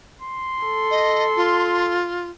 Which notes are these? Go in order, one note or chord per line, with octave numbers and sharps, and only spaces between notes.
C6
A4
D#5
F4